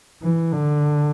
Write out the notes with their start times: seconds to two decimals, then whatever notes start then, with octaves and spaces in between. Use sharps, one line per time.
0.23 E3
0.52 D3